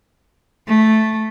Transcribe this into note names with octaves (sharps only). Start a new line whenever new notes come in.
A3